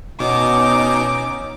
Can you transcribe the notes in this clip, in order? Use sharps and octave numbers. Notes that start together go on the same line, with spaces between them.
B2 C#4 D#4 D6